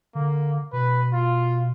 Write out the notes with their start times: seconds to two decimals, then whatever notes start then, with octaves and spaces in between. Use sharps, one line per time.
0.15 D3 A#3
0.73 B2 B4
1.13 F4